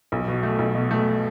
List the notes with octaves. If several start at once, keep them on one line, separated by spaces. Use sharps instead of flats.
B1
B2
A3
B1
B2
A3